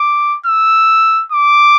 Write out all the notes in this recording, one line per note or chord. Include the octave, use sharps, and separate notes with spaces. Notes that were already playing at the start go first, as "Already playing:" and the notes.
Already playing: D6
E6
D6